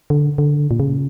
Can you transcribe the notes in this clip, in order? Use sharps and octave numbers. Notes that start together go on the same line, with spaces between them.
D3
D3
A#2
C#3